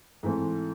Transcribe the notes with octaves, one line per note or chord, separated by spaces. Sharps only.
G#2 E3 A3 C4